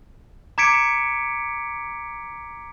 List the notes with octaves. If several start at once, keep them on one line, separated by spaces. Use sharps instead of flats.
A#5 D6 G#6 B6 C#7 D7